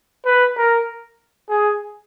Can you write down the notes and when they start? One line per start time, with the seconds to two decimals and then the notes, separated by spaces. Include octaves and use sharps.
0.25 B4
0.57 A#4
1.49 G#4